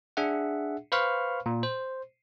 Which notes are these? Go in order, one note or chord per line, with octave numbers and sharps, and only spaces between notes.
D4 G#4 E5 F#5
B4 C5 F5 B5 C#6 F6
A#2
C5